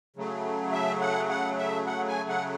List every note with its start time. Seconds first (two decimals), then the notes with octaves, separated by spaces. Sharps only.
0.16 C#3 F#3 A3
0.72 E5
1.01 F#5
1.30 F#5
1.58 E5
1.87 F#5
2.08 G#5
2.29 F#5